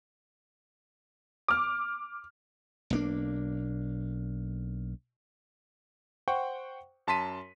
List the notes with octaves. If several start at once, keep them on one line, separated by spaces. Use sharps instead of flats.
D6 F6
B1 A#3 D4
C5 F#5 G5 C#6
F#2 A5 C6 B6 D#7